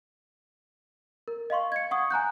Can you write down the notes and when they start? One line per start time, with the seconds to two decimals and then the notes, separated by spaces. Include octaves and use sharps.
1.28 A#4
1.50 D#5 F5 C6 C#6
1.72 G#6 C#7
1.91 F#5 C#6 D#6
2.11 G#5 A#5 F#6 G6